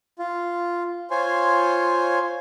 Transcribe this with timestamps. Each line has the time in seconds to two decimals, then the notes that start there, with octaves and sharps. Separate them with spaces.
0.19 F4
1.11 F4 C5 C#5 G#5 C6